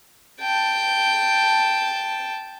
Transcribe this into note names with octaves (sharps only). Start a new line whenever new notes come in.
G5 A5